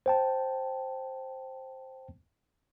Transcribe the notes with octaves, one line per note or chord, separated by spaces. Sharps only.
C5 G5 A5